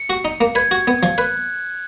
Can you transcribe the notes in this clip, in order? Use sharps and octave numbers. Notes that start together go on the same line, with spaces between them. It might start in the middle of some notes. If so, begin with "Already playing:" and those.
Already playing: C#7
F#4
D#4
A#3
B4 G#6
F#4
B3
F3
B4 F#6